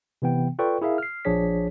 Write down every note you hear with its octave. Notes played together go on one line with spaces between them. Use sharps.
C3 E3 B3 G5
F4 A4 B4 D5 G5 C#6
E4 G#4 A#4 E5 F5
F6 C7
A#1 F3 D4 G#4 C#5 B6